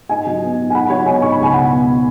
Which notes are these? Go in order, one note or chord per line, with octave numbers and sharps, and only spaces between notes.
G#2 D#5 G#5
F#3
B3
G#2
G#5
G#2 F#5 B5
F#3 C#5 F#5
B3 D#5 G#5
G#2 C#6
B5
C#2 G#5
B2 F#5 B5
B3